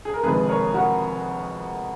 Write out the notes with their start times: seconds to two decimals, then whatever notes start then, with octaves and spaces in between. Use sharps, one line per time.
0.05 G#4
0.14 A#4
0.23 F1 F2 D#3 G#3 G#4 B4
0.49 A#4 C#5
0.74 F#4 A#4